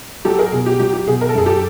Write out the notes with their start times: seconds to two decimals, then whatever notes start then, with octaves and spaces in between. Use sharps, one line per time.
0.25 F#3 G4 A4
0.38 G#4 A#4
0.52 B2 G#4
0.66 G4
0.79 F#3 G4
0.93 G4
1.07 B2 G#4
1.21 A#4
1.29 A4
1.35 F#2 G#4
1.46 G4 A4